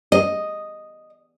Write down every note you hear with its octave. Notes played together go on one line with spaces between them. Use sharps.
D#5